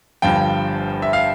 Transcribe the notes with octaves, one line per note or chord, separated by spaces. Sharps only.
G1 G2 F3 G5
E5
F5